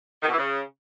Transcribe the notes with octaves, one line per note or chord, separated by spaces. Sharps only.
D#3
B2
E3
C#3